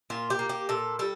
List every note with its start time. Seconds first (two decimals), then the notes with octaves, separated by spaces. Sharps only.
0.10 A#2 F4
0.30 G4
0.39 A#3
0.49 G4
0.69 A#2 A4
0.99 G3 A4